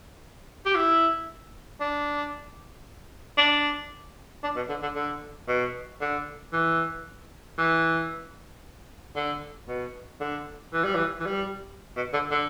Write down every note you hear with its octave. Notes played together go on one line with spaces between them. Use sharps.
G4
E4
D4
D4
D4
B2
D3
D3
D3
B2
D3
E3
E3
D3
B2
D3
E3
G3
E3
E3
G3
B2
D3
D3